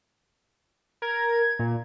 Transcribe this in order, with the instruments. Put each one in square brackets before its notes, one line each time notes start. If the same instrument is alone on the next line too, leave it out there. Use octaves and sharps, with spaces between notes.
[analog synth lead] A#4 [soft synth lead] G#6
[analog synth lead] A#2